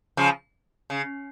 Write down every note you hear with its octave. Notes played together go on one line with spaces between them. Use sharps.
C#3 F3
C#3